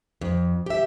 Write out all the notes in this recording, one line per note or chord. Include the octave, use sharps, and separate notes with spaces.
F2
G4 E5